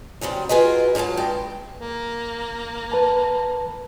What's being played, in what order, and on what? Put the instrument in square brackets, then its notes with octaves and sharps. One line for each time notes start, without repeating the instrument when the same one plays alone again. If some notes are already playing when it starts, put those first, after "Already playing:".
[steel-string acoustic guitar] C#3 F#3 G3 C4
F4 F#4 G#4 A#4 B4 D#5
G#2 F#3 G#4 F5 A5
G2 G#3 G5 A5
[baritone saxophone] A#3
[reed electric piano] B4 A5